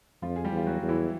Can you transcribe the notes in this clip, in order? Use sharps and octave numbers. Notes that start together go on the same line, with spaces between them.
F2 F3 F4
G#4
G3 G4
E2
F4
F#3 F#4
E2
E3 E4